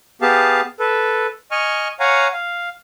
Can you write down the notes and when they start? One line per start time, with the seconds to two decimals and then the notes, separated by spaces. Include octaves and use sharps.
0.22 B3 G4 G#4 F5 A5
0.80 A4 B4
1.51 D#5 G#5 C#6 F6
2.00 C#5 F5 F#5 G#5 A#5
2.33 F5